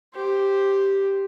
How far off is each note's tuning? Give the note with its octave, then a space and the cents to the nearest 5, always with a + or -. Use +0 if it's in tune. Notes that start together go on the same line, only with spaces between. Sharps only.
G4 +0 C5 +0